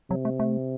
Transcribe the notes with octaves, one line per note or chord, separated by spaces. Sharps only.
C3 F#3
A3
A3